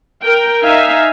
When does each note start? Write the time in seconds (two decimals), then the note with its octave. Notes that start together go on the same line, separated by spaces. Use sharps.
0.23 A#4 G5
0.63 D#4 E5 F5 G#5